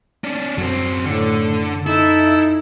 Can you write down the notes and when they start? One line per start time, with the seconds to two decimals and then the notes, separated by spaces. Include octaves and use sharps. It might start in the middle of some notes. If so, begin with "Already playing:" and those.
0.24 C#4 D4
0.58 F#2 F#3 C4
1.05 A2 D3
1.87 D#4 E4 A4